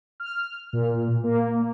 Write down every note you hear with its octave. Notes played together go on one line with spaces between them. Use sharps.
F6
A#2
A#3